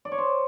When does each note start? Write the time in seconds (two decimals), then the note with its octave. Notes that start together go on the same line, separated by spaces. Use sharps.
0.05 D5
0.12 C#5
0.18 C5